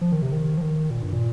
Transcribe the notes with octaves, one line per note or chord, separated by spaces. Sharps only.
F3
D#3
C3
D#3
F3
D#3
A#2
G2
A#2